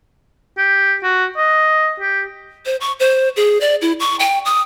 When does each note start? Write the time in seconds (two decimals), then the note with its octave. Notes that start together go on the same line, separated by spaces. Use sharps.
0.58 G4
1.03 F#4
1.37 D#5
2.00 G4
2.66 C5
2.81 C#6
3.00 C5
3.36 G#4
3.61 D5
3.82 E4
4.00 C#6
4.20 G5
4.45 D#6